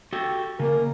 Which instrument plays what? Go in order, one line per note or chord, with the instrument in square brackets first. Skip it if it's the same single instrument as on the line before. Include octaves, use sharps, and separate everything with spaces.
[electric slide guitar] F#4 G4 A4
[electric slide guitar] C#3 A#3 [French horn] A#4